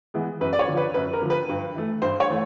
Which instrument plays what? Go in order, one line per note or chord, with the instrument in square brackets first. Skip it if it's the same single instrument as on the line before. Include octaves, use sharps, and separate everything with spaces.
[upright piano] E3 G#3 B3
F#2 B4
D5
C#5
D3 F3
B4
F#2 B4
A#4
D3 F3
B4
G2
E3 A3
G2 C5
C#5
E3 A3